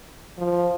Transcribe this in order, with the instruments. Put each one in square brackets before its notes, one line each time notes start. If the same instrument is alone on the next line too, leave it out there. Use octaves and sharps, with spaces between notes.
[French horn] F3